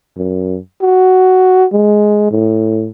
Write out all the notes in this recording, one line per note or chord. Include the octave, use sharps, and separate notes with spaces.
F#2
F#4
G#3
A2